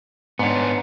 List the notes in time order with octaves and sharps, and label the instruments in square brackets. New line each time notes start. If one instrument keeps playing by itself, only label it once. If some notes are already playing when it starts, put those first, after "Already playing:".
[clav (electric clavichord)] G#2 C#5 [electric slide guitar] B3 D4